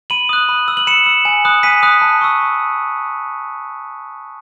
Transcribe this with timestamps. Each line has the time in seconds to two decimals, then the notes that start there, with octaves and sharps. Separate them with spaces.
0.10 B5 D#7 F#7
0.29 D#6 F#6
0.49 B5
0.68 E6
0.77 F#7
0.87 B5 C#7 E7
1.06 E6
1.25 G#5
1.45 B5 D#6 F#6
1.63 G#5 B6 D#7
1.83 B5 D#6 F#6
2.02 A5
2.21 C#6 E6